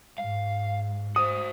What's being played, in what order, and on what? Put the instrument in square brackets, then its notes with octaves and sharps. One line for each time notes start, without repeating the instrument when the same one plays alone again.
[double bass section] G#2 [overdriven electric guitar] F5
[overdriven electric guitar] F#4 C5 [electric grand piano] D#6